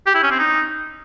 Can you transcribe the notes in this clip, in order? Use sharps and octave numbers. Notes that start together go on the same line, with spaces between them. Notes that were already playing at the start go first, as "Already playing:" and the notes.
G4
E4
C#4
C4
D#4